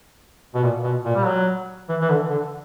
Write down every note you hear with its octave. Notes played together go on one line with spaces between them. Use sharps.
B2
A#2
B2
A#2
G3
F#3
E3
E3
D3
D3